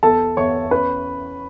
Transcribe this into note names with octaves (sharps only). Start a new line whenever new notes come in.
E2 A4 A5
E2 C#5 C#6
C#4 B4 B5